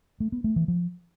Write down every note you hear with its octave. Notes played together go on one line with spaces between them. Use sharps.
A3
B3
A3
E3
F3